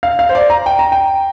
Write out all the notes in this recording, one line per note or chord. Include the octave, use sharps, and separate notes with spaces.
F5
F5
C5
D5
A#5
G5
A#5
G5